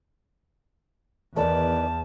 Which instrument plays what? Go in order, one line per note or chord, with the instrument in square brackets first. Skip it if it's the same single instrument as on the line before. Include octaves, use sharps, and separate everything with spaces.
[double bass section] E2 [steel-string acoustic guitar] D#3 B4 D5 [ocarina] A5